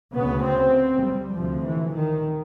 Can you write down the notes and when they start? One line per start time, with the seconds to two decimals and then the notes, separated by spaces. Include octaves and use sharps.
0.14 D2 C#3 B3
0.44 C4
1.06 G3
1.36 D2 C3 F3
1.65 E3
1.95 D#3